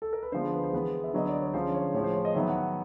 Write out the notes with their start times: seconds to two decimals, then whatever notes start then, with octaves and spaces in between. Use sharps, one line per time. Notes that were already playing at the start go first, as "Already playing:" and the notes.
0.02 A4
0.13 A#4
0.23 B4
0.32 D3 F3 G#3 B3 C5
0.54 B4
0.64 C5
0.73 E3 G#3 B3 B4
1.04 E5
1.14 D3 F#3 B3 D#5
1.28 D5
1.42 C#5
1.54 D3 F3 G#3 C#4 C5
1.74 C#5
1.94 A2 F3 G#3 C#5
2.04 C5
2.15 C#5
2.25 D#5
2.35 D#3 F#3 B3 E5
2.48 F#5